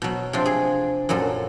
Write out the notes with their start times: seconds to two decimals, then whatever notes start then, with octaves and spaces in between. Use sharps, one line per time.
0.02 B2 F#3
0.33 C3 F3 C4 D4
0.46 G#4
1.09 F#2 A#2 F#3 A4